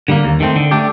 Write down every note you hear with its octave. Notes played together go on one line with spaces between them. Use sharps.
D3 G3 A#3
D#2
D#3 A3 C4
D3
A3 D4 G4